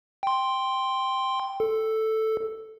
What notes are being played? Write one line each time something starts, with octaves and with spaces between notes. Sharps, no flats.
G5 C6
A4